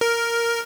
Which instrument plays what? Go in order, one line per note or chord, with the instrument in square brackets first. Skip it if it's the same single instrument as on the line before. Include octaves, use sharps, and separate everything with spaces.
[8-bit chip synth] A#4